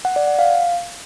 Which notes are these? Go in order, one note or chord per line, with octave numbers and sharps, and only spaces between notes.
F#5
D5
F#5
F5